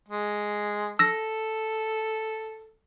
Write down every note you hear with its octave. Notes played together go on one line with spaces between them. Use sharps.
G#3
A4 E6 A#6